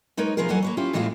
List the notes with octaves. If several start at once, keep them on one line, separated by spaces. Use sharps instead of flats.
G#3 D#4 A#4 B4 C#5
C3 F3 B3 F4 G#4 A#4
F2 E3 F#3 A4 F#5 G#5
A#3 B4 C#5
C#4 E4 F4 G4
A2 E3 G#3 A#3 E4 F4